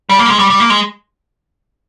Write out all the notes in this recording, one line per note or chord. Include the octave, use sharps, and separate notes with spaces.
G3
A#3
G3
G#3
G3
G3
A#3
G#3